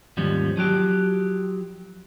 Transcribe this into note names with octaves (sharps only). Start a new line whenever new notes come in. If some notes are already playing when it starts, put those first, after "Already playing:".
D#2 G#2 F3 G3 C#4
F3 F#3 G4